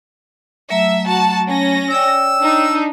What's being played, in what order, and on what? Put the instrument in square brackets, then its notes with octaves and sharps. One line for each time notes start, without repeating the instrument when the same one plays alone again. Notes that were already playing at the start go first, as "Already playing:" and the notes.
[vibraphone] F#3 A3 A#5 [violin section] E5
[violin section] F#4 A5
C#4 A#6
[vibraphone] C#5 D5 G5 [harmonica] E6
[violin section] D4 D#4